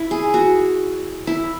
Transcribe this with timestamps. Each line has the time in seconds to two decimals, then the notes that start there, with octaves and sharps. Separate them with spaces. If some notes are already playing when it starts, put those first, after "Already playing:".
Already playing: E4
0.11 G#4
0.34 F#4
1.27 E4